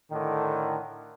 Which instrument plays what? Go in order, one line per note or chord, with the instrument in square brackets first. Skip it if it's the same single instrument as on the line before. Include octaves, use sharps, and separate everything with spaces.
[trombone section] A2 D3 D#3